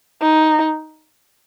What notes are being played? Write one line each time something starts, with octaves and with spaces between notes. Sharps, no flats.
D#4